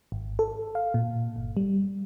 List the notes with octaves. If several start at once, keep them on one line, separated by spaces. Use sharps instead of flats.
G#1
A4
F5
A#2
G1
G3